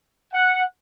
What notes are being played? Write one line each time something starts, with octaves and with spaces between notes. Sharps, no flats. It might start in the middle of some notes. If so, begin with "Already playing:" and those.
F#5